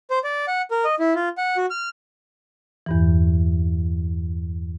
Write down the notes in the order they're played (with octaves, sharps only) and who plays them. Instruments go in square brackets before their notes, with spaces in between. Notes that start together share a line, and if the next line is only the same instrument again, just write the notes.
[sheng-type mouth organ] C5
D5
F#5
A#4
D#5
E4
F4
F#5
F#4
F6
[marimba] E2 G2 E3